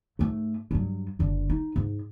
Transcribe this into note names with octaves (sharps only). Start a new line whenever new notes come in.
G#2 A3
G2 F#3
F#1 D3
D#4
G#2